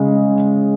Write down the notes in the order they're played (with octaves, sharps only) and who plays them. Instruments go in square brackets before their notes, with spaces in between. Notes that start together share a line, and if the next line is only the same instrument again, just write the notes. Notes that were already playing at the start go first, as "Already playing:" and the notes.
Already playing: [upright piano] C#3 G#3